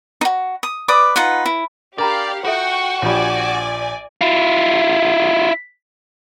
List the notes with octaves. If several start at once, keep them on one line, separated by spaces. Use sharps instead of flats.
D#4 F#4
D#6
B4 D5 D6 D#6
D#4 F4 B4 F#5
E4
D4 G4 A#4 D5 F5 A#5 B5
F4 F#4 A4 E5 F#5 G5 C#6
A#1 F3 G4 C#5 D5 G5 G#5 B5
E4 F4